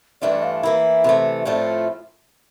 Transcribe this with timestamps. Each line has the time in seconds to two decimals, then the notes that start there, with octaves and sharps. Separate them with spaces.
0.22 G2 E3 A3 D4 F4 D5
0.43 F5
0.63 E3 A#3 E4 E5
1.04 C3 E3 A3
1.45 A2 F3 A3 C4 F4 D5